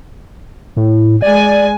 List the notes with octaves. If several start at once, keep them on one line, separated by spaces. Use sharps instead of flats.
A2
G#3 D5 G#5